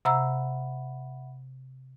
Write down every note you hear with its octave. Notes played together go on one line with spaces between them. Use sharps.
C3 E5 F#5 A#5 B5 E6